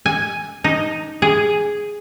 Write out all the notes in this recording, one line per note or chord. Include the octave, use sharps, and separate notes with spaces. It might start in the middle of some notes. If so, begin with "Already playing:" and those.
G#5
D#4
G#4